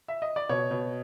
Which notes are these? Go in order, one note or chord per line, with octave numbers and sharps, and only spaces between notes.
E5
D#5
D5
B2 C#5
B2